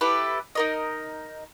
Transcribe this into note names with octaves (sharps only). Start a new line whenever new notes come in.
E4 G4 A4 B4
D#4 A#4 D#5